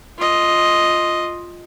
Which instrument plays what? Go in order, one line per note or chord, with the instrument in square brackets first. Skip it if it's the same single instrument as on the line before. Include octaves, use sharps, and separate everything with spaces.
[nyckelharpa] F4 D#5